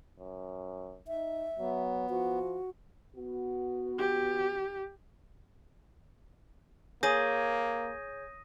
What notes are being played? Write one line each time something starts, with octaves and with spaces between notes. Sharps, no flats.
F#2
D#4 E5
F#3 B3
F3 F#4
B3 F#4
G4
A#3 G#4 C#5 D#6 G6 A#6 D#7